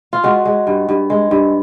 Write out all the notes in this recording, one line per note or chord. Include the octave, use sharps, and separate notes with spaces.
F4
G#3 F#4
G#3
G2
G2
G#3
G2